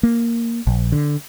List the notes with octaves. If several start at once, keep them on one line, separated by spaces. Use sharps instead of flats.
A#3
A#1
D3